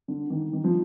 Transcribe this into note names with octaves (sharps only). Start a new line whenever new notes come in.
D3
D#3
D#3
F3